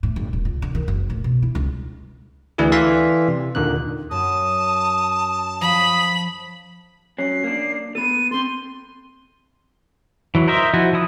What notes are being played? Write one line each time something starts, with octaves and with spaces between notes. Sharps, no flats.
A2
G1
D#1
C#2
D3
D#3
F#1
A2
B2
E4
C#2
D2 E3 D4 E4 G#4
E3 A4 D5 F5 C6 B6
C3
D#2 A#2 D3 D#3 F#6
F#2 A5 D#6
F3 B5 D#6
F#3 C#4 C7
A#3 D4
B3 A4 D#7
C4 A4 C6
E3 F#3
A#4 C5 D#5 E5
F3 E4 F#4
F3 E4 D#6